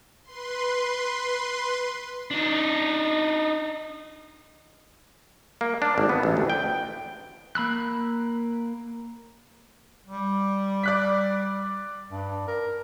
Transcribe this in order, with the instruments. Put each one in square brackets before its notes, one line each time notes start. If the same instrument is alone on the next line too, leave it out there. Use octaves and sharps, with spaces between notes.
[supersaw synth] B4 C6
[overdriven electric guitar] D4 D#4
[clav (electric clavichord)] A#3
D4
G#1
B3
A1
D2
G5
[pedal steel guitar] A#3 B5 E6 F#6
[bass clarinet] G3
[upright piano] D5 F#6 B6
[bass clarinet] G2
A#4